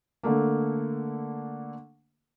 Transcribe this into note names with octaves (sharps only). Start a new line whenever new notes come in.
D3 A3 A#3